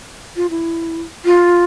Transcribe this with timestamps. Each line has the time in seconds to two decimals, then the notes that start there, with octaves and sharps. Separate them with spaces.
0.36 F4
0.50 E4
1.25 F4